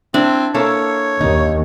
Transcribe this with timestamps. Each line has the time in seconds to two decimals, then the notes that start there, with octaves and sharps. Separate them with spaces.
0.14 C4 D4 E4
0.54 A#3 E4 A4 C#5
1.21 D#2 D#4